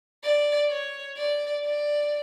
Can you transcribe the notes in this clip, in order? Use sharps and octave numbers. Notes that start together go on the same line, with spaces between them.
D5
C#5
D5
D5